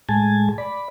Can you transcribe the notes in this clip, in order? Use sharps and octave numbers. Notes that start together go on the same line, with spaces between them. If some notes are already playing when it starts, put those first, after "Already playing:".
A2 G#3 G#5 A5
D5 B5